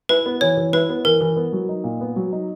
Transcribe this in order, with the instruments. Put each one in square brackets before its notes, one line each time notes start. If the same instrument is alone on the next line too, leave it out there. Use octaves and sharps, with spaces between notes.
[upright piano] E4 [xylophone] B4
[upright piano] B3
[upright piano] E3 [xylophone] C#5
[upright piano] E3
[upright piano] E4 [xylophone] B4
[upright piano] B3
[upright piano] E3 [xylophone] A#4
[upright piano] E3
B3
F#3
D#4
A#2
B3
F#3
D#4